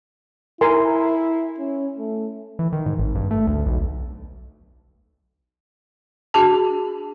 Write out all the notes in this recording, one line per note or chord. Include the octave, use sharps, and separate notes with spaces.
E4 A#4 G#5 C6
C#4
A3
E3
D#3
G#2
G#1
G2
A3
D2
B1
D4 F#4 G#4 A5